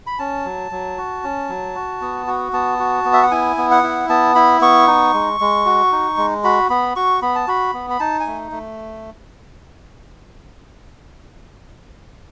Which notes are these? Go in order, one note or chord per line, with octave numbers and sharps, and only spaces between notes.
B5
C#4 A5
F#3
F#3
F#4
C#4
F#3
F#4
B3
F#4
B3 A5
F#4
B3
E5
F#5
E4 G#5
B3
F#5
E4
B3 A5
E4 B5
B3 C#6
D#4
G#3
G#3
F#4
D#4
G#3
F#4 B5
B3 B5
F#4 C#6
B3 B5
A5
F#4 B5
B3
B5
D#4 A5
G#5
A3
A3